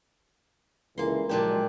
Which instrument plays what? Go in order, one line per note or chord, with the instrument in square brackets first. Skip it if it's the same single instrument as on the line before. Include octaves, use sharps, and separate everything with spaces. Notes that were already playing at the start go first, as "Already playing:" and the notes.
[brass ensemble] C#2 D3 E3 [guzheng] A#3 C6
[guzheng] A#2 D4 G4 [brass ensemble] F3 F#3 G#3